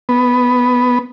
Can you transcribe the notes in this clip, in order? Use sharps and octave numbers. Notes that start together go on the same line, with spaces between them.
B3